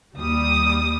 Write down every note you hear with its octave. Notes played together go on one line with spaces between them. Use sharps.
D#2 G3 D#6